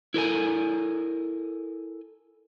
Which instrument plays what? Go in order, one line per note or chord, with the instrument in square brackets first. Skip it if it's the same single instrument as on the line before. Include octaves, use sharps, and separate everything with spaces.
[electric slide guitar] E4 A4 A#4 G#5